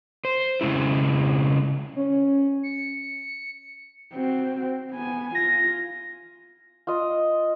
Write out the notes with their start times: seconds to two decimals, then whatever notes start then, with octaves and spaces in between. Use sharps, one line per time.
0.25 C5
0.61 C#3 G#3 C#4 E4
1.96 C#4
2.63 C#7
4.14 C4 F#4
4.92 B3 G#5
5.35 F4 A#6
6.87 F4 D#5